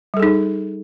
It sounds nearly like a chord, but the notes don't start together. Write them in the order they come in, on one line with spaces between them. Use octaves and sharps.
G3 A4 G#4 D#4